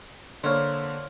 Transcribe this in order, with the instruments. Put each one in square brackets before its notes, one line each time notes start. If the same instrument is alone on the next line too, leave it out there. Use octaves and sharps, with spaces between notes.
[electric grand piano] D3 A#3 [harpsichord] C5 C#5 F5